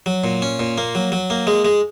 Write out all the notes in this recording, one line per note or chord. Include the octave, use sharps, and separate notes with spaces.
F#3
A#2
C#4
A#2
A#3
F#3
F#3
A#3
G#3
G#3